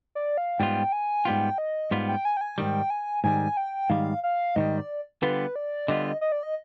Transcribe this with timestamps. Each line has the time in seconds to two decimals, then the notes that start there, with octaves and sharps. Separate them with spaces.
0.15 D5
0.38 F5
0.59 G#2 G3 B3 F4 G5
0.92 G#5
1.25 G#2 G3 B3 F4 G5
1.58 D#5
1.91 G#2 G3 B3 F4
2.08 G5
2.25 G#5
2.37 G5
2.41 G#5
2.57 G#2 D#3 G3 G5
2.90 G#5
3.24 G#2 D#3 G3 G#5
3.57 G5
3.90 G#2 D#3 G3 F5
4.23 F5
4.56 G#2 D#3 G3 D#5
4.78 D5
5.22 D3 G3 B3 F4 B4
5.56 D5
5.88 D3 G3 B3 F4 D#5
6.21 D#5
6.32 D5
6.43 D#5